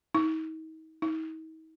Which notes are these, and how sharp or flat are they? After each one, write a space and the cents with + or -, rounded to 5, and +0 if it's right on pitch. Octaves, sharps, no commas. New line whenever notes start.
D#4 +40
D#4 +45